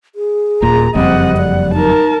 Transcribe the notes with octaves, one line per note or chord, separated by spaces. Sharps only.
G#4
D#1 A#2 A#5
F#1 F2 G3 C4 D#5 F#5
D5 F#5
D#4 A#4 A5